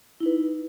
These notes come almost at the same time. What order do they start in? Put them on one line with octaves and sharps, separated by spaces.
E4 D#4 B4